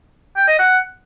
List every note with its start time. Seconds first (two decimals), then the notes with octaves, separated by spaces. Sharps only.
0.36 G5
0.48 D#5
0.59 F#5